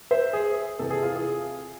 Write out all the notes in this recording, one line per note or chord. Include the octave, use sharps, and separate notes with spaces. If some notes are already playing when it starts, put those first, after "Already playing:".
C5 E5
G#4
E2 C3 E3 A4
G#4
F4
G#4